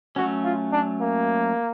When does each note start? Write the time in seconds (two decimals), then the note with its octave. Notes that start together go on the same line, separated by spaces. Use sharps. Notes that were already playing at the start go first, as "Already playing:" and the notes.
0.16 F#3 A3 C#4 F#4
0.44 F4
0.72 D4
1.01 A#3